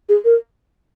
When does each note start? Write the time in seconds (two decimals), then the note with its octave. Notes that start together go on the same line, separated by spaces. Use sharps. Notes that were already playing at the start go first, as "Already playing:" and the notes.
0.09 G#4
0.24 A#4